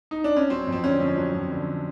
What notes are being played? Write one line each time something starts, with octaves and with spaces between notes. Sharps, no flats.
D#4
D4
C#4
F#3 C4
F2
C4
D3 C#4
F2
F#3
F2
D3